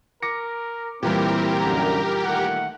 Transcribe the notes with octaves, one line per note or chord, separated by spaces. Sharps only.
A#4 D6 A#6 C#7
A#2 E3 G3 C4 E4 G4 A#4
F#2 D3 A#5
D#3 A3 F#5